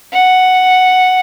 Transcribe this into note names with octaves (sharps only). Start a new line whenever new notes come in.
F#5